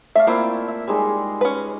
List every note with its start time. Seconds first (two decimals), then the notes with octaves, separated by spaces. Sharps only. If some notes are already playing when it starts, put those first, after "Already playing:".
0.15 A3 D5 E5 F5
0.27 A#3 C4 E4 F4
0.68 E5
0.88 G3 G#3 D#4
1.41 C#4 B4